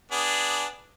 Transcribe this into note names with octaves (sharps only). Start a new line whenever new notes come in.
B3 D4 G#4